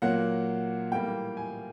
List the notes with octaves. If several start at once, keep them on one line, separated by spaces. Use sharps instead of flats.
A#2 F#3 A#3 F#5
A2 E3 G3 A#3 G5
G#5